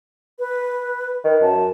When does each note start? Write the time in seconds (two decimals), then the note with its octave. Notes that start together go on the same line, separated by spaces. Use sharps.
0.39 B4
1.24 D#3 B4
1.42 F#2 A5